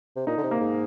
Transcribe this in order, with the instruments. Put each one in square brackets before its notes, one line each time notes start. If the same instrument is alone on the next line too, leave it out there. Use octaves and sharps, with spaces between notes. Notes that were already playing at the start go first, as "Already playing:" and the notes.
[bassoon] C3
[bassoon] A#2 [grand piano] D#4
[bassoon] D3
C3
[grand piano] A#3
[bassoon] G#2